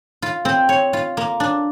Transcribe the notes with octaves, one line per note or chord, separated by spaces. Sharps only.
F4
C4
C#5
F4
A#3
D4